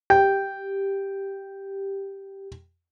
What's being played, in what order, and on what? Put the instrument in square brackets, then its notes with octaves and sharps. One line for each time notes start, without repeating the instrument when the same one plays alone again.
[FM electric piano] G4 [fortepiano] G5